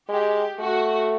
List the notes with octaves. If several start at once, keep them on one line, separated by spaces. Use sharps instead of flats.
G#3 G4
A3 F#4